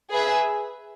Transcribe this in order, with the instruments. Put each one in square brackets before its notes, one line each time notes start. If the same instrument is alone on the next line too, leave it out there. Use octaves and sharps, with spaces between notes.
[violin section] G#4 B4 E5